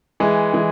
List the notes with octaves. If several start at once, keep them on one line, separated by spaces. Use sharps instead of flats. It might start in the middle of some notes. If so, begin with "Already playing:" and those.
E3 G#3
E3 G#3